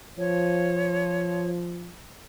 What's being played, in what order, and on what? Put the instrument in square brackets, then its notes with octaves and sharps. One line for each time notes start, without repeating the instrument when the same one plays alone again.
[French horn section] F3 [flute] C#5